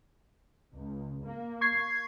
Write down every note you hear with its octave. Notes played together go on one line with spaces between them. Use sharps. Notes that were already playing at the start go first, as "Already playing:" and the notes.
C#2
A#3
C#6 G#6 C7